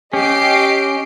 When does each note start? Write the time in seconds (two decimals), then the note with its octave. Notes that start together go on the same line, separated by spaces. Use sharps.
0.13 C#4 G4 D#5 C7 D7